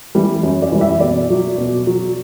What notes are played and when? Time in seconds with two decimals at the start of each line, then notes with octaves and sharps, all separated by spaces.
0.15 E3 G3
0.43 F#2
0.62 D5
0.72 E3 G3
0.81 E5
1.00 B2 D5
1.30 F#3
1.58 B2
1.87 F#3